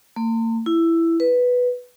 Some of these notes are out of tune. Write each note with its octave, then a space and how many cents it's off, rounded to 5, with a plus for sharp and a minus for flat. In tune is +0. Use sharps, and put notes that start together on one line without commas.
A#3 -45
E4 +10
B4 +0